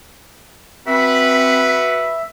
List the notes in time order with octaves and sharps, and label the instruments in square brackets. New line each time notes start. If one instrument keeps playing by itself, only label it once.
[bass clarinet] C4 [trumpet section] F#4 B4 [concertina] E5 [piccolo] B6